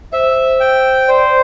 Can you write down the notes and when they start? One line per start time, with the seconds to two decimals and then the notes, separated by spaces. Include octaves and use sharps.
0.13 C5 E5
0.60 G5
1.08 C5 D5